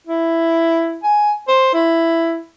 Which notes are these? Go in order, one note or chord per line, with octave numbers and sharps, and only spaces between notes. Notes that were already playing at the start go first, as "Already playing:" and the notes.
E4
G#5
C5
E4